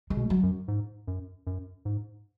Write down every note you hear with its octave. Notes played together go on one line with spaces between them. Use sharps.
G#3
B2
F#3
F#2
G#2
F#2
F#2
G#2